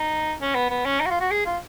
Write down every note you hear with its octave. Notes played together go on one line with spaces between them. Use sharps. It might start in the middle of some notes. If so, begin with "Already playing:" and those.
Already playing: D#4
C#4
B3
B3
C#4
D#4
F#4
F4
F#4
G#4
F4